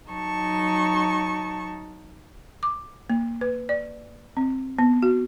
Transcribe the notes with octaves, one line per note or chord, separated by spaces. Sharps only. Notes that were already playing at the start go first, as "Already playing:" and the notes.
F#3 D#4 A5 C#6
D6
A#3
B4
D5
C4
B3
F#4